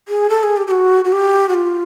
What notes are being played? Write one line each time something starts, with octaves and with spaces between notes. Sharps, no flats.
G#4
A4
G#4
G4
G4
F#4
F#4
G4
F#4
F4